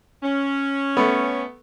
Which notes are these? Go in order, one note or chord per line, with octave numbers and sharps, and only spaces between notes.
C#4
A3 B3